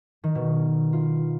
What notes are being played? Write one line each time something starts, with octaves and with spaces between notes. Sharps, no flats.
D#3
B2
F4